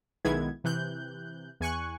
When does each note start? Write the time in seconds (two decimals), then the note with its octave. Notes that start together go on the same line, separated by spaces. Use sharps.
0.25 B1 D#3 G#3 B3 E4 G#6
0.64 C3 E3 F#6 G6
1.60 E2 G#5 C#6 F#6